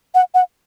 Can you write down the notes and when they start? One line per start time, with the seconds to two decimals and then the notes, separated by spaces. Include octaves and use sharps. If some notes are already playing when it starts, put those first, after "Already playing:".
0.14 F#5
0.34 F#5